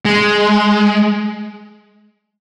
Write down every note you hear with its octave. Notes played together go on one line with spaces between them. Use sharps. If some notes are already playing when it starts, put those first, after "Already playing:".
G#3